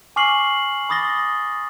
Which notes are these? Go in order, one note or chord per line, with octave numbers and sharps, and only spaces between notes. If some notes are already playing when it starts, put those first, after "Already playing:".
G#5 C#6 D6 F6 C7 F#7
B5 D6 D#6 A6 A#6 G7